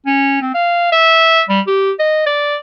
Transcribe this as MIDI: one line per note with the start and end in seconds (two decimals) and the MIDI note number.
0.06 0.40 61
0.41 0.51 60
0.54 0.88 77
0.92 1.43 76
1.49 1.61 55
1.67 1.91 67
1.99 2.23 75
2.26 2.57 74